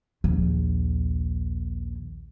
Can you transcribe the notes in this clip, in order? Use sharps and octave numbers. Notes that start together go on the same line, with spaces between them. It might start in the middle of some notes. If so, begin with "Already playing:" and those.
A#1 D#2